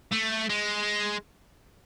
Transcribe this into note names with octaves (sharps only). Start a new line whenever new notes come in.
A3
G#3